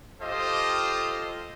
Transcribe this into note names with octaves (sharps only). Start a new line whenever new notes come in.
F4 G4 A4 C5 D#5 F5